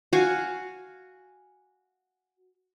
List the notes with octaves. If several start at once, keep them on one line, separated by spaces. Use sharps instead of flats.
F#4 F5 G#5